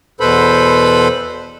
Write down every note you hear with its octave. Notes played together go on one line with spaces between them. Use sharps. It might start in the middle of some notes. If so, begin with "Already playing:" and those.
E2 B2 A4 B4 C5 B5